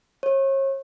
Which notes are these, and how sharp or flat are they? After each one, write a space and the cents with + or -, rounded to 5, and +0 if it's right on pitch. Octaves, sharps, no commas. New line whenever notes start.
C#5 -40